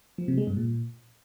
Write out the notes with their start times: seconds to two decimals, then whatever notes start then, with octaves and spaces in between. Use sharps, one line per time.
0.18 F3
0.28 C3
0.38 G#3
0.47 G2
0.57 A#2